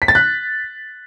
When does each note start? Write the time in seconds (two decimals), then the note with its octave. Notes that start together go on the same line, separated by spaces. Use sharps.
0.02 B6
0.08 A6
0.15 F#6